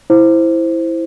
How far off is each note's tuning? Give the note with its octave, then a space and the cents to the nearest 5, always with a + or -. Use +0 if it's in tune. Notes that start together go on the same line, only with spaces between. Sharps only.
E4 +0 C5 +0